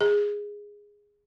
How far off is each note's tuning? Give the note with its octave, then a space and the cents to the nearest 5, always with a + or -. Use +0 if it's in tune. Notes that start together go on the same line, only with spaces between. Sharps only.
G#4 -10